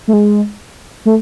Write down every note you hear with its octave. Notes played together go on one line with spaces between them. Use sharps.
A3
G#3
A3